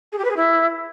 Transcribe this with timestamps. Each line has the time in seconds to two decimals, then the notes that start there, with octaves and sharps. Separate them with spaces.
0.12 G#4
0.18 G4
0.24 B4
0.30 G#4
0.36 E4